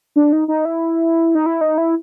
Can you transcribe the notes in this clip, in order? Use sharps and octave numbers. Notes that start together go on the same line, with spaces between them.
D4
D#4
D#4
E4
D#4
E4
D#4
E4